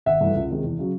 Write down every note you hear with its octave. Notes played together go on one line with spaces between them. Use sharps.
G#1 E5 F#5
G2 E3 A3
C#2
C3 D#3 G#3
E2
C#3 F#3